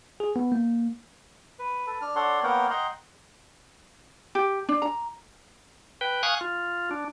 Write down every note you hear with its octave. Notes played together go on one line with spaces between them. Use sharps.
G#4
B3
A#3
B4
A4 B4
D4 F6
D4 A4 C#5 F#5 C6
A#3 B3 A#4 C#5 F#5 G5
D#5 F#5 G5 A#5 C6
G4
D4
A#5
B4 G5
F5 G#5 C#6 D#6 F#6
F4
D4